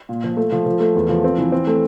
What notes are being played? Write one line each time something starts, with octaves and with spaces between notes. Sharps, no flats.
A#2
F3
A3
F3
F3
A3
E2
F3
C4
E3
C4
A3